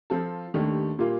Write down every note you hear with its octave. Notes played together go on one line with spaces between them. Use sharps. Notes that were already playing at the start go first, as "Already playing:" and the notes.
F3 C4 F4 A4
D#2 D#3 A3 D4 G4
A#2 G3 A#3 F4